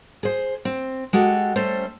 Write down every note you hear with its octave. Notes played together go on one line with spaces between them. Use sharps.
G#4 C5
C4
G#3 F#4 G4 A4
G3 A3 C#4 C5